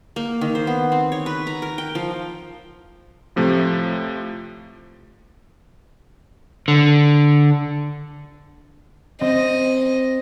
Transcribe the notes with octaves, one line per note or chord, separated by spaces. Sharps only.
A#3
D#3
C5
B3
C4
C#5
B4
A#5
A#4
G5
F3
A2 C3 F3 A3
D3
C4 D#5